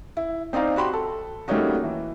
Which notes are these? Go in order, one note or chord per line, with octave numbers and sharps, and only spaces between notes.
E4
C4 D#4 D5 F5 A#5
F#4 G4 B5 C6
A4
G3 A3 A#3 C#4 D#4 F#4
E3